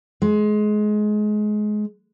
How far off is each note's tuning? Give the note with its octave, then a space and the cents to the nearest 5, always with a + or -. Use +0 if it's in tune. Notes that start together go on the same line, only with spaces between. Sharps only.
G#3 +25